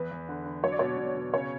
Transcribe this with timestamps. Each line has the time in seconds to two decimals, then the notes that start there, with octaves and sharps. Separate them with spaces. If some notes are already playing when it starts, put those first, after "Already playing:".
Already playing: E2 B4
0.11 E2
0.29 D3
0.46 D3
0.63 F#3 C#5
0.72 D5
0.79 B2 C#5
0.98 B2
1.16 B2
1.33 C#3 C#5